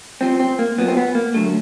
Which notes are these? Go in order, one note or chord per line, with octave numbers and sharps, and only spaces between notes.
C2 C3 F3 C4
C4
A#3
B1 A#2 F#3 B3
C4
B3
A#3
F#2 D3 F#3 A3